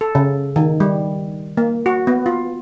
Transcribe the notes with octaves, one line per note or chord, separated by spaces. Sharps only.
A4
C#3
D#3
G3
A#3
F#4
B3
F4